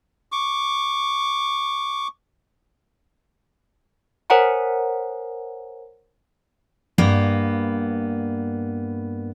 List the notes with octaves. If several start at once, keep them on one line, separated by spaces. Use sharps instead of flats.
C#6 D6
A#4 C5 C#5 F#5 G#5 A#5
G2 A#3 B3